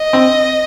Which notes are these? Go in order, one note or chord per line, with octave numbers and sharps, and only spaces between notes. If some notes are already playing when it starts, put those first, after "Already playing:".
Already playing: D#5
C4